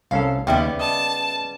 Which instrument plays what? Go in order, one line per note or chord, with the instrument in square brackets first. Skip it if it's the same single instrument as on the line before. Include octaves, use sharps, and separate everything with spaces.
[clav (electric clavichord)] C2 C#4 A4 [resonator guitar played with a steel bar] F5
[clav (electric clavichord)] D#2 [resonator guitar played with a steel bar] C#3 G3 B3 [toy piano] E5 G5
[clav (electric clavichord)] D#5 [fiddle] A5